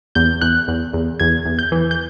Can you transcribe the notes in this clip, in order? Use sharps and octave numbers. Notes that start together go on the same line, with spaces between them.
E2 G6
E2 F#6
E2
E2
E2 G#6
E2
G6
E3
G6